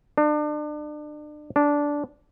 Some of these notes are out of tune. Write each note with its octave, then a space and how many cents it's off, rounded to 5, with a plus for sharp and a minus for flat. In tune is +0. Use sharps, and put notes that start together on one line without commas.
D4 +35
D4 -10